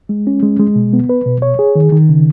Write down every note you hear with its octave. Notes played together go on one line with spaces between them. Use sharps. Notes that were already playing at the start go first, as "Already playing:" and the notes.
G#3
C#4
G#3
G#3
B2
B3
B4
B2
C#5
G#4
D#3
D#3
C#3